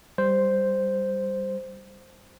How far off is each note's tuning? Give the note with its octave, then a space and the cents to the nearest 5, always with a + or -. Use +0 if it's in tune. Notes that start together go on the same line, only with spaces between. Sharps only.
G3 +0 C5 +0